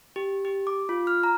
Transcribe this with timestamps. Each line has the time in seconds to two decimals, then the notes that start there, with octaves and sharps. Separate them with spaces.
0.16 G4
0.45 G4
0.67 D6
0.89 F4
1.07 F6
1.23 A#5